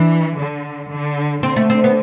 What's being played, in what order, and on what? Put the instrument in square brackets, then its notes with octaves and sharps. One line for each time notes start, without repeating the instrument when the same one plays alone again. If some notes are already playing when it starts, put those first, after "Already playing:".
Already playing: [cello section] E3 [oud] D4
[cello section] D3
D3
[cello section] D3 [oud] C4
[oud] A3
C4
B3